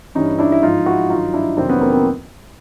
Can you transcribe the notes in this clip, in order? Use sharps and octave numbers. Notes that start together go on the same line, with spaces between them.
G2 E3 G3 C#4 D#4
D4 E4
E4
G#2 F3 D#4 F4
E4 F#4
G2 D#3 F#3 D#4 F4
D4 E4
F2 C3 D#3 F#3 C4 D4
B3 C#4
A#3 C4
A#3 C4